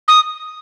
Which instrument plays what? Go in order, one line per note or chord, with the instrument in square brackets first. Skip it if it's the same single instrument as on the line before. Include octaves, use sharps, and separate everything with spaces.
[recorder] D#6